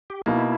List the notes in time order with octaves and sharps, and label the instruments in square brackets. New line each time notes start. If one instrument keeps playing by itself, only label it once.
[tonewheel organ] G4
[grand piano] B2 A#3 D#4 [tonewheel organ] E4